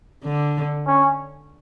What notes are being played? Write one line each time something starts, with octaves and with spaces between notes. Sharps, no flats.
D3
C#4